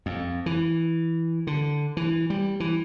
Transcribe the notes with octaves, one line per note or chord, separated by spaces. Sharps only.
F2
E3
D3
E3
G3
E3